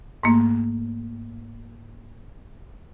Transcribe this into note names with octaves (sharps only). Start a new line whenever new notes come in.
G#2 A3 A#3